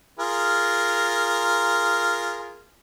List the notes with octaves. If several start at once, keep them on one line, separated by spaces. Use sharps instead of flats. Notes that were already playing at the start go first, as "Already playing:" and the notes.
F4 G#4 A#4